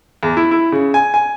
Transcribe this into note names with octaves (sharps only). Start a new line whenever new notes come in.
E2
E4
E4
C#3
G#5
G#5